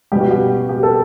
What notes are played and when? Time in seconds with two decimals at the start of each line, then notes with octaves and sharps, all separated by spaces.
0.12 B2 G3 G4
0.21 F#4
0.31 G4
0.69 G4
0.83 A4